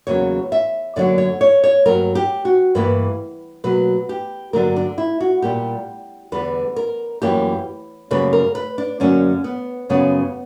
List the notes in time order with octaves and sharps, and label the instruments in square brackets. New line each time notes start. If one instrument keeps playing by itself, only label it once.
[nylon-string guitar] E2 C#3 F#3 A#3 C#5
E5
F#2 D3 F#3 A#3 D5
C#5
C#5
C#5
G2 F#3 A#3 A#4
G4
F#4
G2 E3 A#3 B4
B2 F#3 A#3 B4
G4
G2 D3 F#3 A#3 A#4
D4
E4
F#4
A#2 G3 A#3 G4
E2 D3 G3 B4
A#4
F#2 E3 G3 A#3 G4
F#2 C#3 G3 A#3 B4
A#4
B4
D4
F#2 D3 F#3 A#3 C#4
B3
F#2 C#3 G3 B3